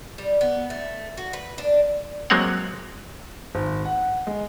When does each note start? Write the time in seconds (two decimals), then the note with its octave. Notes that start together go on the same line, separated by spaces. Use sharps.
0.18 G3
0.41 B3
0.70 A3
1.17 F#4
1.33 B4
1.58 D4
2.30 F#3 G#3 A#3 C4 C#5 F#5
3.55 G#1
3.85 F#5
4.27 G#3